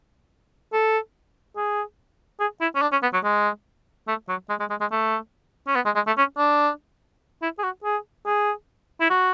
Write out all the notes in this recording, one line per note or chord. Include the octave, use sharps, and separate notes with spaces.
A4
G#4
G#4
E4
C#4
D4
C#4
B3
F#3
G#3
A3
F#3
G#3
G#3
G#3
G#3
A3
C#4
B3
G#3
G#3
A3
C#4
D4
E4
G#4
F#4
G#4
G#4
E4
F#4